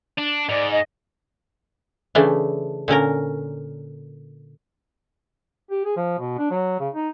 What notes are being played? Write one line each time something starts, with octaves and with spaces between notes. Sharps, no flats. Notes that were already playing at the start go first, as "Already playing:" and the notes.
D4
G#2 D5
D#5
C#3 E3 A3 D4
A#2 D3 C#4 A#4
G4
G#4
F3
B2
D4
F#3
C#3
D#4